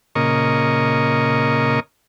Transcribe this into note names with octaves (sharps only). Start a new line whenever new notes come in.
A#2 C#3 A#4 D#5 C#6